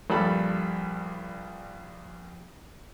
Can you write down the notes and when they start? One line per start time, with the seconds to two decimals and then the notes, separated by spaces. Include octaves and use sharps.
0.10 A#1 G2 A4 B5